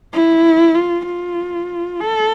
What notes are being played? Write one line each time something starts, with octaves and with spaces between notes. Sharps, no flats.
E4
F4
F4
A4